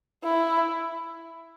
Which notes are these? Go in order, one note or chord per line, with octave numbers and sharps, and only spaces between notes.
E4